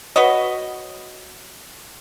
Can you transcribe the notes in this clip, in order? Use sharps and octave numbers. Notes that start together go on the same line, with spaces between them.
F#4 B4 C#5 D#5